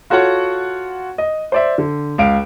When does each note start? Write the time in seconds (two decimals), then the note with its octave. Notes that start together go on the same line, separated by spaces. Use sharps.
0.10 F4 F#4 A4 C#5 F#5
1.18 D#5
1.52 C5 D5 E5
1.78 D3
2.18 C#2 F5 D7